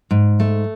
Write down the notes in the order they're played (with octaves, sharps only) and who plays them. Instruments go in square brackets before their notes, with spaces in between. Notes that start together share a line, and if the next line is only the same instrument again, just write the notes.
[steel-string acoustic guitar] G#2
A3